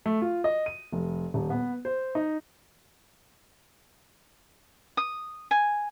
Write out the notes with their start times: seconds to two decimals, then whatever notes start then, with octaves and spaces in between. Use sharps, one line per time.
0.06 A3
0.22 F4
0.44 D#5
0.66 D#7
0.92 F1
1.34 D#1
1.50 B3
1.85 C5
2.15 D#4
4.97 D#6
5.51 G#5